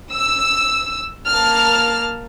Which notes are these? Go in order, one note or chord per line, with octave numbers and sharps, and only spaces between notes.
E6
A#3 A5 F6